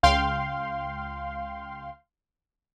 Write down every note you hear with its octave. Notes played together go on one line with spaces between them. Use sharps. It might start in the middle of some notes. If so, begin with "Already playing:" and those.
C#2 F5 G5 C6